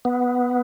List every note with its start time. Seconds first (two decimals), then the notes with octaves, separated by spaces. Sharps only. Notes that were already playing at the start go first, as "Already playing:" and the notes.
0.05 B3